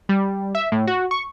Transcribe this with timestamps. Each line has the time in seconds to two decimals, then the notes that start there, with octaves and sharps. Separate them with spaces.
0.09 G3
0.55 E5
0.72 A2
0.87 F#4
1.11 C#6